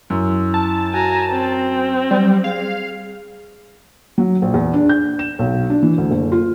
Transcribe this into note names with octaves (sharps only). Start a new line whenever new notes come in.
F#2 E4 C6 E6
A5
F#4 G#5 A#5
C4
F#3 G3
G#4 F5
F#3
A#1
E2
D4
G6
E7
B1
D4
E3
D2
F#1
F4